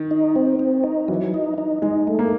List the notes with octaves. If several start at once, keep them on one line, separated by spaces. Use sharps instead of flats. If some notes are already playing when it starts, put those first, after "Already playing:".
Already playing: D#3
D#4
C4
C4
D#4
E3 F#3
D#4
D#4
G#3 D#4
A3
A#3